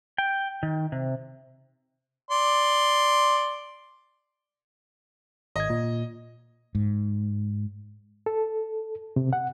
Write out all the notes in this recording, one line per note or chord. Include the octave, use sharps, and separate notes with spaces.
G5
D#3
C3
D5 C6
G#1 D#5 G#6
A#2
G#2
A4
C3
F#5